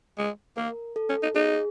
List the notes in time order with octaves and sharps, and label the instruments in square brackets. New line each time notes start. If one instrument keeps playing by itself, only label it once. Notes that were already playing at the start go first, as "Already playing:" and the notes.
[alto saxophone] G#3
[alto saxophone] A#3 [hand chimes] A#4
[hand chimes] A4
[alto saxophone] C#4
D#4
[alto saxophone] D#4 [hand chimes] G#4